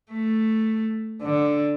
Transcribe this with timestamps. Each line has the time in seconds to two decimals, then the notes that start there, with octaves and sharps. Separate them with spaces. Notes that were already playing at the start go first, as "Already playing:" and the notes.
0.11 A3
1.22 D3